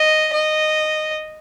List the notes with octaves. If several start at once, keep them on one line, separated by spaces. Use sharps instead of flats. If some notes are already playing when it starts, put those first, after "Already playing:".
Already playing: D#5
D#5